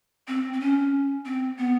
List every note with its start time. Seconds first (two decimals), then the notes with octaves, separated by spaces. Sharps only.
0.28 C4
0.53 C4
0.60 C#4
1.25 C4
1.58 B3